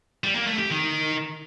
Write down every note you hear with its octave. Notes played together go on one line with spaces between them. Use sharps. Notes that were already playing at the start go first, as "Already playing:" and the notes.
G3
A#3
A3
G4
D#3